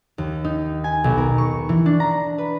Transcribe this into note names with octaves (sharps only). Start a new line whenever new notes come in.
D#2
D#4
G#5
B1
A#4
C#6
E3
D4
A#5
B4